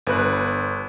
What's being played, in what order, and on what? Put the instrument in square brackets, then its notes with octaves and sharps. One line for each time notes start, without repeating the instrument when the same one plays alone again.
[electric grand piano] G1 B4 F#6